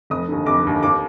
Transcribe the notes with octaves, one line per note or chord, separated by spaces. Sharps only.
F1 D#6
D#2 D3
F1 D6
D#2 D3
D#2 D6